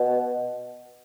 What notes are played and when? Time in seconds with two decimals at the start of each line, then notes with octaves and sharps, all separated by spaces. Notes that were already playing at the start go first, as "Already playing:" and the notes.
Already playing: B2